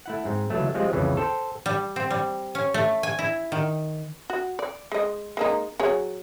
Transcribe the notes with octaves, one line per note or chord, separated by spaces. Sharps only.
A3 E4 F#5
G#2 C4
C#2 E3 F#3 A3
F3 G3 G#3 C4 F4
C2 F2 C#3 E3
A4 C5 G5
G3
C4
G3
C#4
A3
G#5
E4
D#3
F#4
D5
G#3 D#5
G#3 A#3 D#4
F#3 G#4 C#5